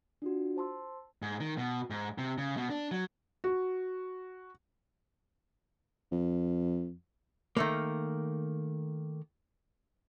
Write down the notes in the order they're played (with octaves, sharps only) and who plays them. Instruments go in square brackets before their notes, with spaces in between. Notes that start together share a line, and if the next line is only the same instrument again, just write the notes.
[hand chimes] D4 F4 F#4
C5 A5 C6 E6
[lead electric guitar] G#2
D#3
B2
G#2
C3
C#3
B2
D4
F#3
[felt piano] F#4
[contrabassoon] F2
[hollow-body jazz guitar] D#3 A3 A#3